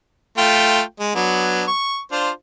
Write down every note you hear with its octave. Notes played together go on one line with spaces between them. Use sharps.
A3 F4 G5
G#3
F#3 B3 D4
C#6
D4 F4 C5